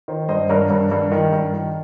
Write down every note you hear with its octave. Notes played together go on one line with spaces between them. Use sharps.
D#3 C5
G2 C5 D#5
G2 A#4 C#5
G2
G2
D#3
G2
D#3